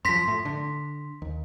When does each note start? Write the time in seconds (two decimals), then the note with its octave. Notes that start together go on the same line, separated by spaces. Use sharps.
0.05 F#2 F3 C6 A#6 B6
0.28 A2
0.45 D3
1.22 D#2